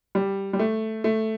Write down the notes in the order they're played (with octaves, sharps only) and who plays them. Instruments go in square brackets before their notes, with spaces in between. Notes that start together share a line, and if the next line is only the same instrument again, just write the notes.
[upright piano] G3
G3
A3
A3